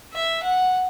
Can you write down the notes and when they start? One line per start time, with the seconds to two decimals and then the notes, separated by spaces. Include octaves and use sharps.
0.13 E5
0.43 F#5